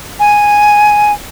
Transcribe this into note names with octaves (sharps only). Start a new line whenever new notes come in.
G#5